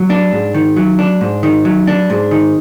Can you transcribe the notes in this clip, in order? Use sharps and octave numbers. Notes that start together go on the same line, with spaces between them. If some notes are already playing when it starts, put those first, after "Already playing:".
Already playing: F#3
D4
G#2
D#3
F#3
D4
G#2
D#3
F#3
D4
G#2
D#3